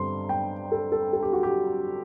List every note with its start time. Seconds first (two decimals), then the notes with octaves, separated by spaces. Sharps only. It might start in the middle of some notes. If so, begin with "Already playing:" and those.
Already playing: G2 D3 G3 C4 C6
0.29 G5
0.72 A4
0.92 A4
1.13 A4
1.23 G4
1.33 F#4
1.43 G4